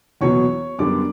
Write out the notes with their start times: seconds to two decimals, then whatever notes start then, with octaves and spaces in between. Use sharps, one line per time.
0.21 E2 B2 F#3 B3 C#5 C#6
0.79 F#2 D3 G3 B3 D4 D5 D6